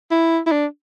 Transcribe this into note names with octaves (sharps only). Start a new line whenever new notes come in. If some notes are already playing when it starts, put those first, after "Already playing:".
E4
E4
D4